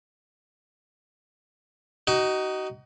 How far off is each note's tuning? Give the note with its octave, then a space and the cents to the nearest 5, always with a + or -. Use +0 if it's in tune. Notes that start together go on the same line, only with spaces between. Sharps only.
D#4 +0 F#4 +35